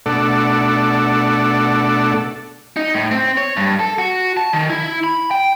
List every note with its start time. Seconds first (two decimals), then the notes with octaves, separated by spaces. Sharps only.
0.06 B2 A3 D4 A4 D5 F#5
2.76 D#4
2.94 A2
3.11 C4
3.37 C#5
3.57 G2
3.79 A4
3.98 F#4
4.37 A5
4.53 D#3
4.70 E4
5.04 B5
5.31 G5